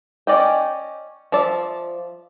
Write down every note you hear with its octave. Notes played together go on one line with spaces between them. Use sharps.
C#4 D5 D#5 G5
F3 D5 E5